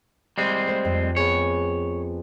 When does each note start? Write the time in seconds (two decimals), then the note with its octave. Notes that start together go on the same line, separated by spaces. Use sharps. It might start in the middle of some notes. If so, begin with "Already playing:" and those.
0.38 G3 G#3 C4
0.68 A3 C5
0.85 F2
1.16 B3 G#4 C#5